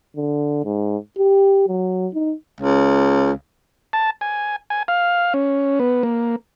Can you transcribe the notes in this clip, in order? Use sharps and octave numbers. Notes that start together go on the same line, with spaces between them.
D3
G#2
G4
F#3
D#4
C#2
A5
G#5
G#5
F5
C#4
B3
A#3